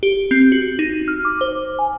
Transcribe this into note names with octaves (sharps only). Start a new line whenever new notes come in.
G4
C4
F#4
D#4
F6
D6
C5
G#5